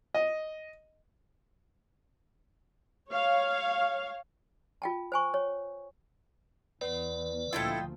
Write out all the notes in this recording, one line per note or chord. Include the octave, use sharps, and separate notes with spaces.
D#5
C#5 F5
F4 G5 A5
C5 G#5 C#6
C#5
E2 B3 B4 D5
D2 A#2 F3 E4 F4 A4 D#5 G5